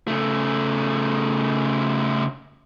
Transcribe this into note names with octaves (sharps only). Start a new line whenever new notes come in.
C#3 A3